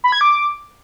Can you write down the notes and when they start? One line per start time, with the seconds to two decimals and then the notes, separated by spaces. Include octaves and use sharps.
0.04 B5
0.12 G#6
0.21 D6